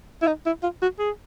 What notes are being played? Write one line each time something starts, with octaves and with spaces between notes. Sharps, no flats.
E4
D#4
E4
F4
F#4
G#4